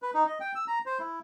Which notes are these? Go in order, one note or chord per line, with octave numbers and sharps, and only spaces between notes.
B4
D#4
D#5
G5
E6
A#5
C5
E4